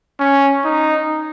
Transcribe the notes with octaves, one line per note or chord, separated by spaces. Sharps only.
C#4
D#4